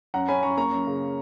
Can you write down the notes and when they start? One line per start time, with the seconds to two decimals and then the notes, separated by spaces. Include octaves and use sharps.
0.14 F#2 F#5 A#5
0.28 C#4 G#5 B5
0.43 F#2 A#5 C#6
0.57 A#3 A#5 C#6
0.72 F#2
0.87 C#3